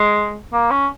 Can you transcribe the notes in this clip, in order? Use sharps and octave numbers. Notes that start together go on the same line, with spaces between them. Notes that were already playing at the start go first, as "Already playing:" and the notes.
Already playing: G#3
A#3
C#4